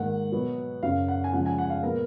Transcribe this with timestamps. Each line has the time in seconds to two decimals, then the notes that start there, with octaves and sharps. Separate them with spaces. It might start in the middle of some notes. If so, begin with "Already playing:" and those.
Already playing: G#2 D#3 A#3 F#5
0.32 B2 F#3 B3
0.83 F#2 C#3 F#3 F5
1.08 F#5
1.24 G#5
1.33 C#3 F3 G#3 F#5
1.46 G#5
1.58 F#5
1.70 F5
1.83 A#2 G#3 B3 A#4